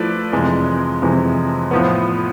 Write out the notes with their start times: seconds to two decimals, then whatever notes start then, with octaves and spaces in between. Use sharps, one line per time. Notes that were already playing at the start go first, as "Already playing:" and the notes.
Already playing: F3 A3 E4 B4 D5
0.32 F2 C3 E3 G#3
1.02 F2 C3 E3 G#3
1.71 A2 F3 B3